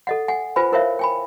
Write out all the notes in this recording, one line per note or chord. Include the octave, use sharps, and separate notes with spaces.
A4 D#5 F#5
F#5 G#5
F4 B4 C5 G#5 B5
E4 A#4 C5 C#5 E5 F5
G5 G#5 B5